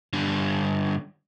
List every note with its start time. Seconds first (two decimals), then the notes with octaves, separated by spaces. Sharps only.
0.13 G2 D3